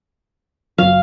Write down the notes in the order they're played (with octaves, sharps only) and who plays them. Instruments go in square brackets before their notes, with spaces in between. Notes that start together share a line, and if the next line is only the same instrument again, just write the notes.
[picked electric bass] F#1 F#3 [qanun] F5